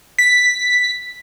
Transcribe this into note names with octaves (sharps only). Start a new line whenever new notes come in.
B6